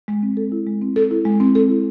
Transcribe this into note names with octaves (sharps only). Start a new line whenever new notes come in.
G#3
C4
A4
E4
G#3
C4
A4
E4
G#3
C4
A4
E4